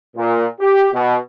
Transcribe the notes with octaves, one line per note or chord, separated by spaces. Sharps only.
A#2
G4
B2